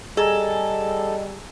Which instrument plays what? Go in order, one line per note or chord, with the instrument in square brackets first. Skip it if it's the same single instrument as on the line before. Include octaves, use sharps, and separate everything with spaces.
[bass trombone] G3 [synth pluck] G#4 G#5 A#5 [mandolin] A4 [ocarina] D#5